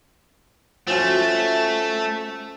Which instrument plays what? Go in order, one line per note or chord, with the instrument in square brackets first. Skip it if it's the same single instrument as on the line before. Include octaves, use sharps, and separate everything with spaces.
[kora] F3 C#4 F#4 [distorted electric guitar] A3